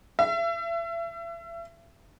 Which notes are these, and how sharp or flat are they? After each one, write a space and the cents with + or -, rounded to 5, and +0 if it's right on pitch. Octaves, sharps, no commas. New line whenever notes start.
E5 +35